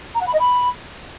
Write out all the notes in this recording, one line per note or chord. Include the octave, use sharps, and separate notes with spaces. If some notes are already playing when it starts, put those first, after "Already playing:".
A#5
F#5
B5
D#5
B5